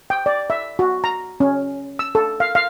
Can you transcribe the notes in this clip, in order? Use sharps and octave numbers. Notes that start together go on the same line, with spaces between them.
G5
D5
E5
F#4
A#5
C#4
E6
A4
F5
F5